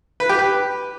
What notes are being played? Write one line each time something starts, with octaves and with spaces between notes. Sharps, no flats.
B4
G4
B4